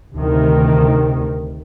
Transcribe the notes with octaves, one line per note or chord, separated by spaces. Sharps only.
D2 C3 D#3